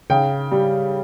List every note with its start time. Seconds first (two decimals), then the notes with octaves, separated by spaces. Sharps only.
0.10 C#3 G5
0.51 G3